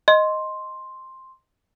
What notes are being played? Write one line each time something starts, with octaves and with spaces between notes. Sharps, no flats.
D#5 C6